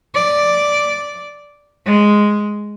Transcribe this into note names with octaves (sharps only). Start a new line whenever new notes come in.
D5
G#3